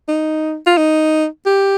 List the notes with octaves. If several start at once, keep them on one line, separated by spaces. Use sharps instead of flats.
D#4
F4
D#4
G4